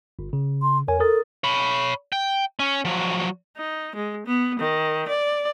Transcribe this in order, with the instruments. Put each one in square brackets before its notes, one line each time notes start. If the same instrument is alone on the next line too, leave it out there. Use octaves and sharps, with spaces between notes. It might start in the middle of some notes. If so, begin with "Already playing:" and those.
[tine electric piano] G1
C#3
[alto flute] C6
[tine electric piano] E2 C#5 G#5 [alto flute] A#4
[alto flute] A4 [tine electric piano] A#4 D#6 A6
[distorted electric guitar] C#5 B5
G5
C#4
F3 F#3
[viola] D#4
G#3
B3
D#3
D5